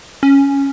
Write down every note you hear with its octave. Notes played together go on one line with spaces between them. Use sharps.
C#4